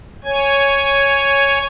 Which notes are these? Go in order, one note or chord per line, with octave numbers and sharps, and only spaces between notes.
C#5 G#5 G#6